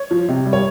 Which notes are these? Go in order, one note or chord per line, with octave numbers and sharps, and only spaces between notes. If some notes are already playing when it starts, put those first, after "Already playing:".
Already playing: C#5
F3
C3
G3
C#5